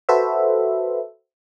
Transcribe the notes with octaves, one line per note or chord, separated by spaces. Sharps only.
F#4 A4 B4 C5 E5